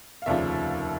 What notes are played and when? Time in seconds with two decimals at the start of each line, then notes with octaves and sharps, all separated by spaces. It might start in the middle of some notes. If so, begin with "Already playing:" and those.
0.22 F5
0.26 F1 D#2 C#3 F3 D5 E5